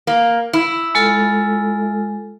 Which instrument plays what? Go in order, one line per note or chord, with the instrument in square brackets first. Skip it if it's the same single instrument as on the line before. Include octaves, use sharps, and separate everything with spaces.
[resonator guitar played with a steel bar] A#3
E4
[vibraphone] G#3 F4 A4